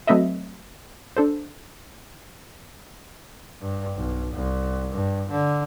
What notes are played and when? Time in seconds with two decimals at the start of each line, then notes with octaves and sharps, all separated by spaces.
0.07 F#3 A3 C4 B4 D#5 E5
1.17 D4 A4 C5
3.61 G2
3.97 B1
4.34 C2
4.93 G2
5.31 D3